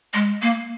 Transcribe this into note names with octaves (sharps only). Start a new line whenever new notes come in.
G#3
A#3